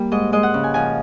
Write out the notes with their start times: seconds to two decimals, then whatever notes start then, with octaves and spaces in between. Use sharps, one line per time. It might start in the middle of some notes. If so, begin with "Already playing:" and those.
Already playing: G3 A#3
0.12 G#2 D#5
0.33 G#3 D#5
0.43 F#5
0.54 C#3
0.64 G#5
0.74 F3 G#5